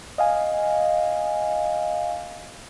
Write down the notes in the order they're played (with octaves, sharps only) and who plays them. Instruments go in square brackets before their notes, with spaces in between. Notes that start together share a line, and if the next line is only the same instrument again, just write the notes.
[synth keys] D#5 F5 G#5